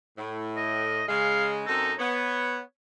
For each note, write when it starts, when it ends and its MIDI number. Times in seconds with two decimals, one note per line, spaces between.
0.17 1.02 45
0.57 1.06 75
1.08 1.62 49
1.08 1.62 56
1.08 1.48 77
1.67 1.94 42
1.67 1.94 60
1.67 1.93 63
1.67 1.94 69
1.99 2.60 59
1.99 2.62 73